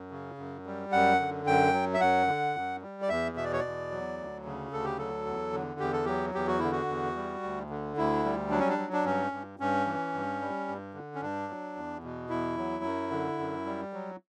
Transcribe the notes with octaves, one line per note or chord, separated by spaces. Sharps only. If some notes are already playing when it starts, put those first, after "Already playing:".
Already playing: F#2
C#3
F#2
G3
F#2 F#5
D3
F#2 G5
F#3
E5
F#2 F#5
D3
F#2
G3
D5
E2 E5
B2 E5
D5
C#5
E2 D5
F#3
D2
C#3
D2 A4
G4
F#3 A4
E2
D3
E2 G4
A4
F#3 G4
E2 G4
F#4
D3 E4
F#4
E2
G3
D2
D3
D2 E4
G3
F#3 D4
C#4
D4
F#3
D4
G2 C#4
G2
G2 C#4
E3
G2
G3
G2
D3
C#4
G2 D4
F#3
E2
B2
E2 E4
F#3
F#2
D3
F#2
G3
F#3